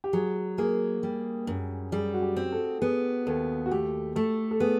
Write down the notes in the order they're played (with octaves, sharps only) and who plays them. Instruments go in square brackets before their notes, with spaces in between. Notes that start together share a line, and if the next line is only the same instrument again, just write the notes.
[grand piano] G4
[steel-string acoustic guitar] F#3 [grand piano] G#4
[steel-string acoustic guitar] A#3 [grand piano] G#4
[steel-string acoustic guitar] G3
F#2
[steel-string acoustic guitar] G3 [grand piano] G#4
[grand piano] F#4
G4
[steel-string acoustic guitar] C4
[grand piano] A4
[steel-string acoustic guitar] B3 [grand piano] G#4
[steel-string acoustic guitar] D#2 [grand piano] A4
[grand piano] F#4
[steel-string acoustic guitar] A3 [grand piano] G4
[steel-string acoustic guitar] A3 [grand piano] A4
[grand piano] A4
[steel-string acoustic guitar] B3 [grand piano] G#4